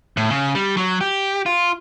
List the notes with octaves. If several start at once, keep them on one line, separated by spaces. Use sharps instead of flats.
A2
C#3
G3
F#3
G4
F4